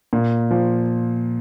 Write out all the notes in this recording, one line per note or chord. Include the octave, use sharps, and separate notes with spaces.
A#2
F3